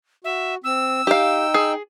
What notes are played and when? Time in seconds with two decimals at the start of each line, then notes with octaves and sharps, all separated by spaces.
0.24 F#4 E5
0.64 C4 E6
1.07 D#4 G4 F5 G5
1.54 G#4